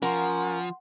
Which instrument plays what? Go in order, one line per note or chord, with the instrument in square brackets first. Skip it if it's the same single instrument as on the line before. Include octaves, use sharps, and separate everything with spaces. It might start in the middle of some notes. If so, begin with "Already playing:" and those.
[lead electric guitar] F3 [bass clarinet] C#4 [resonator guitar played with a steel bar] A#4 [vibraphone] F#5 C6